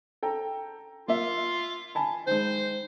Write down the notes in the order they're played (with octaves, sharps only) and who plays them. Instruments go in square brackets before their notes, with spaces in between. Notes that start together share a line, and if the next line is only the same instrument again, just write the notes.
[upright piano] A4 G5 A#5
[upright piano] A#3 E5 [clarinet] F4
[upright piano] G#5 A5 B5
[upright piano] D#3 G#3 [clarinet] C5